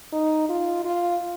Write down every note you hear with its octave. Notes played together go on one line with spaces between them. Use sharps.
D#4
F4
F4